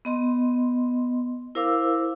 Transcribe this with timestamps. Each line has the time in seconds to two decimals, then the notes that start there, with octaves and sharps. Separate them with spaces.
0.05 B3 D#5 C6
1.55 E4 A#4 C5 F5 D6 E6